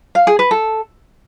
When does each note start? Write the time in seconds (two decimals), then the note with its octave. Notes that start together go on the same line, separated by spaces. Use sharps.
0.15 F5
0.27 G#4
0.39 B4
0.51 A4